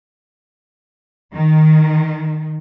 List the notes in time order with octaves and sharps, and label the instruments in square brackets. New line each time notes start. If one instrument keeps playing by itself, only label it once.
[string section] D#3